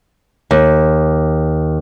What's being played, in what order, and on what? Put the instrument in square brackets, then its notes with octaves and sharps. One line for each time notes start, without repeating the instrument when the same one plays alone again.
[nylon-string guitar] D#2